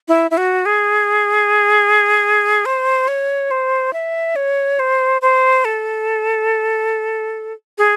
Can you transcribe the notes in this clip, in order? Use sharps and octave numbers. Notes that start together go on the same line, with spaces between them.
E4
E4
F#4
G#4
C5
C#5
C5
E5
C#5
C5
C5
A4
G#4